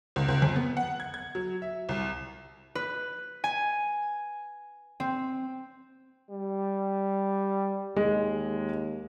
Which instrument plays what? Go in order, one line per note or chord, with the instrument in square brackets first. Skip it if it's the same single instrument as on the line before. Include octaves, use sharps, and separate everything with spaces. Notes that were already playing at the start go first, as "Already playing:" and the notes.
[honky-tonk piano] C#2
C#2
F2
B3
F#5
G#6
G#6
F#3
E5
C2
[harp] B4
G#5
C4
[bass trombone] G3
[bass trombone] D#2 [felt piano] G#3